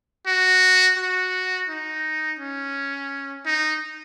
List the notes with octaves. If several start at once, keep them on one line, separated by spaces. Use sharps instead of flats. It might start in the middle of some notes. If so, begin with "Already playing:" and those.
F#4
F#4
D#4
C#4
D#4